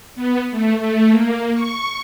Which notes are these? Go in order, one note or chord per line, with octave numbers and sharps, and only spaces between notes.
B3
A3
A3
A#3
C#6